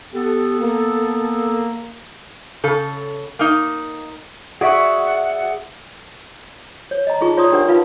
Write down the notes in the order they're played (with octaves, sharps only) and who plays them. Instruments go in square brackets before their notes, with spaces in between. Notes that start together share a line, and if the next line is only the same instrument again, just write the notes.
[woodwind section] B3 A4 [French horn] G4
[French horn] A#3
[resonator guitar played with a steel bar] C#3 A4
A#3 D#4
[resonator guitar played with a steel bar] F#4 [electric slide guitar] G#4 D5 E5 [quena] F#5
[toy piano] C#5
D#5 A#5
D#4 F4 G#4 C#6
F4 C#5 D5 A#5 C6 D#6
D4 G4 A#4 C#5 F#5
D#4 F4 B4 F5